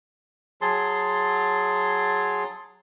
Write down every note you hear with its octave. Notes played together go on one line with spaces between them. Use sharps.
F#3 G#4 A5 C6